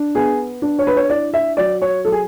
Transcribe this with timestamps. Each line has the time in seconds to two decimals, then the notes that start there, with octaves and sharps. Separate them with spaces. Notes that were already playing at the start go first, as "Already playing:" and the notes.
Already playing: D4
0.15 B3 G#4
0.62 D4
0.79 C#5
0.87 B4
0.96 C#5
1.09 E4 D5
1.34 E5
1.57 F#3 D5
1.82 C#5
2.05 F#3 A4
2.12 G#4